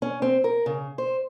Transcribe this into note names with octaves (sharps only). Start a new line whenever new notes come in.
C#4
C4
A#4
C#3
C5